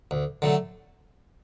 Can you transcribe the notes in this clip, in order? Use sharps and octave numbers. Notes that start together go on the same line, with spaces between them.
D2
D3 F#3 A3